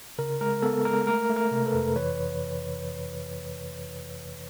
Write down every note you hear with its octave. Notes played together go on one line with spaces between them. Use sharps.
C#3 A#4
G#3 A#4
B3 A4
G#3 A#4
A3 A#4
A3
A#4
C3
A4 B4
F2
E3 B4 C#5